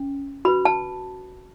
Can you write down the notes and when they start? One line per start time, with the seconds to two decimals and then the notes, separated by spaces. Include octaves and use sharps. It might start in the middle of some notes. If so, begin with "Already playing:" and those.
Already playing: C#4
0.45 F#4 B5
0.48 B4
0.65 A5